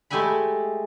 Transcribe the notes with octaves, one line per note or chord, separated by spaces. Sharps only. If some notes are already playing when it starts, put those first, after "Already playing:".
G#3 A3 G4 E5 G#5 B5